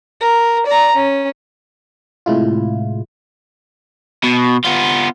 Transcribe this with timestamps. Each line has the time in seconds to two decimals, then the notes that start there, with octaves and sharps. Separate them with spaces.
0.21 A#4
0.66 D5 A#5
0.95 C#4
2.26 A2 C3 G#3 E4 F4
4.24 B2
4.64 B3 F4